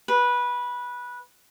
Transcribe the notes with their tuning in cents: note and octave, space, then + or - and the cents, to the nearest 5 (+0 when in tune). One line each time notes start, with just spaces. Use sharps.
B4 -15